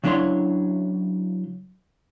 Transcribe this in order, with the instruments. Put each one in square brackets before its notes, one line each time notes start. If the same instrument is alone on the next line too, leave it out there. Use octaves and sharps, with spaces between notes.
[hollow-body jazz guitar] C#3 F#3 D4 E4 C#5 C6